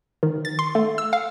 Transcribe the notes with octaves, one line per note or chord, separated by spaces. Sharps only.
D#3
A6
C6
A3
E6
F5